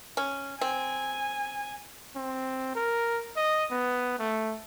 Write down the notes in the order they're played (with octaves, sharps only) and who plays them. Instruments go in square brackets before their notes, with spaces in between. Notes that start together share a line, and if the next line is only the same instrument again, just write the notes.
[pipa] C#4
[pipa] C4 [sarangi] G#5
[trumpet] C4
A#4
D#5
B3
A3